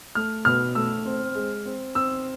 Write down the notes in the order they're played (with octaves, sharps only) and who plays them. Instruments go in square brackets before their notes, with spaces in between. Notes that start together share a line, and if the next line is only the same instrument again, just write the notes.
[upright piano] A3 [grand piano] F6
[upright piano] B2 [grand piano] F6
[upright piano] A3 [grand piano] E6
[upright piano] C4
G#3
C4
[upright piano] C4 [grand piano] E6